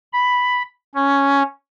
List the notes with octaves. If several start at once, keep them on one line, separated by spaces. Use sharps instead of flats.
B5
C#4